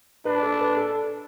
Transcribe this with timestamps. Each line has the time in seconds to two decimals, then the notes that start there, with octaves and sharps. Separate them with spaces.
0.25 D4 B4
0.42 A4
0.61 B4
0.77 A4